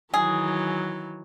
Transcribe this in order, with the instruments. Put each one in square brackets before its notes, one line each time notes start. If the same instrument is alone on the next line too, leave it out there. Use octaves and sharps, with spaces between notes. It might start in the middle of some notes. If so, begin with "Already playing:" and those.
[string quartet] D#3 E3 F#3 [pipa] G#4